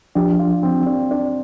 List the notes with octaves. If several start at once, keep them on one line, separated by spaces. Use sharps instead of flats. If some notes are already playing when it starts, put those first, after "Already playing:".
F3 D4 G4
F4
C4
D4
D4